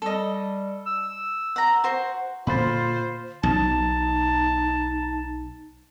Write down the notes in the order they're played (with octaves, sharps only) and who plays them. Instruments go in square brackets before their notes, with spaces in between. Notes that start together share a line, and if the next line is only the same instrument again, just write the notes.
[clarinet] G3 [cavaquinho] A4 D#5
[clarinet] E6
[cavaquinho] F#5 A#5
F#4 C5
[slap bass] A#2 D3 A#3 [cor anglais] F4 [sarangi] C5 [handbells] B5 C6 A6
[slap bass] B1 [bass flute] D#4 [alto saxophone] A5